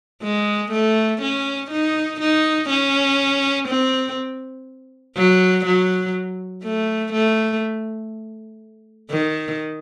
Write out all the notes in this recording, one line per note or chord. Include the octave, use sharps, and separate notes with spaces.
G#3
A3
C#4
D#4
D#4
C#4
C4
F#3
F#3
A3
A3
D#3